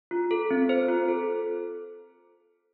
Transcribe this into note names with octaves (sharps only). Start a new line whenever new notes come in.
F4
A4
C4
C5
F4
A4